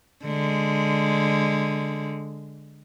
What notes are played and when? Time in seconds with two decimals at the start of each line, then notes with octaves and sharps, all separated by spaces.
0.25 D3 G#3